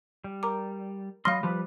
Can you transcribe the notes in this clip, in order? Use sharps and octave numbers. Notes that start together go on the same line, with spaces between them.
G3
A#4 A#5 D6
F#3 D#5 F5 B5 C6 F6
F3 G3 B4